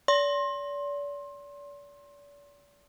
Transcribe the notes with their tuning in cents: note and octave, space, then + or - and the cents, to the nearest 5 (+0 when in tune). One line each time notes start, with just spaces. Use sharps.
D5 -40 C6 +25